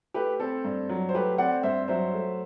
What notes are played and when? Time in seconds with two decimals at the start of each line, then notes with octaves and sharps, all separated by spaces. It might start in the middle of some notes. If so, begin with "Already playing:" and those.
0.14 A3 G4 B4
0.40 C4 A4
0.65 G2
0.89 F#3
1.09 C5
1.14 A3 G4 B4
1.38 C4 D5 F#5
1.63 G2 C5 E5
1.88 F#3 C5 E5
2.14 A3